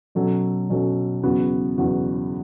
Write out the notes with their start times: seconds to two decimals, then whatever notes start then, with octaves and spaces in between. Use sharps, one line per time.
0.15 B2 F#3 C#4 F#4 A4
0.70 B2 F#3 C#4 F#4 A4
1.23 E2 C#3 F#3 B3 F#4
1.78 E2 C#3 F#3 B3 F#4